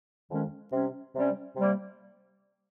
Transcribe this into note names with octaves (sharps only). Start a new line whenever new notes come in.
F2 D#3 G#3 C#4
C3 G3 C#4
C3 G3 C#4
C3 G3 A#3